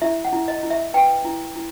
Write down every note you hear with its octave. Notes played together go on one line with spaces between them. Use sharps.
E4 E5
F#5
E4
D#5
E4
E5
B4 G5
E4
E4